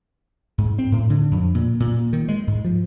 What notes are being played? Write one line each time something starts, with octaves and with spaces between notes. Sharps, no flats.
G#2
C4
A2
D3
F2
A#2
A#2
D#3
G#3
G#2
F3